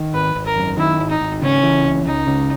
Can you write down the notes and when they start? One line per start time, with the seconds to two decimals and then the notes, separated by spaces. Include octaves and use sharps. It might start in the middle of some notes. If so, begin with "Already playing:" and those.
Already playing: D#3
0.14 G#1 B4
0.35 G#1
0.46 A#4
0.56 F#2
0.77 D#3 E4
0.99 G#1
1.10 D#4
1.21 G#1
1.42 C#3 C#4
1.63 E3
1.85 C#2
2.05 C#2 D#4
2.27 C#3